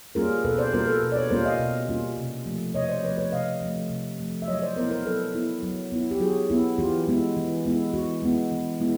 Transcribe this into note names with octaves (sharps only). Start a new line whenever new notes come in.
G3 A#3 C#4 F4 G#4 A#4
B2 A4 B4
C5 D5
G3 A#3 C#4 F4 A#4 C5
A4 B4
B2
D5
B4 C#5
G3 A#3 C#4 F4 A#4 C5
D#5 F5
B2
G3 A#3 C#4 F4
C3
F3 A3
C3 C#5 D#5
C5 D5
F3 A3 B4 C#5
B4 C#5
C3 D#5 F5
F3 A3
C3
F3 A3
E5
F#3 C#5 D#5
C5 D5
B3 E4 A#4 C5
A#4 C5
F#3 A4 B4
B3 E4
F#3
B3 E4
G4
F#3 F#4 G#4
B3 E4
E3 F4 G4
G#3 B3 E4
E3
G#3 B3 E4
E3 F#4
G#3 B3 E4
E3
G#3 B3 E4